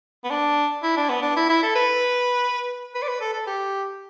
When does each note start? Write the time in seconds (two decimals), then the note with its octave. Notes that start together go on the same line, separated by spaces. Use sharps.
0.24 B3
0.30 D4
0.83 E4
0.97 D4
1.09 B3
1.22 D4
1.36 E4
1.49 E4
1.62 A4
1.75 B4
2.95 B4
3.02 D5
3.08 B4
3.21 A4
3.33 A4
3.47 G4